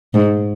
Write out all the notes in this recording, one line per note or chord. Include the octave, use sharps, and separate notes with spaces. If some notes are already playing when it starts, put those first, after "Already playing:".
G#2